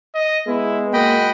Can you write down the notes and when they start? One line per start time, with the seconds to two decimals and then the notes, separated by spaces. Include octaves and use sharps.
0.15 D#5
0.48 G#3 B3 E4
0.93 A#3 F#4 D#5 G5 B5